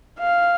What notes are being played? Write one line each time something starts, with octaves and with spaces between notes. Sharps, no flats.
F5